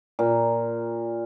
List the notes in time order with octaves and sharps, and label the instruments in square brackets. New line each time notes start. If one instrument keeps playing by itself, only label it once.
[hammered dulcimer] A#2